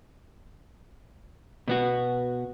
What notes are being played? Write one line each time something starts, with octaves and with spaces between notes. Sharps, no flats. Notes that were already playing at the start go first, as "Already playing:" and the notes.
B2 B3 F#4